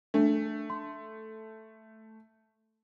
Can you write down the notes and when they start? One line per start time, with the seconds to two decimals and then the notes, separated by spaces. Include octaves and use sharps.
0.14 A3 D4
0.70 C6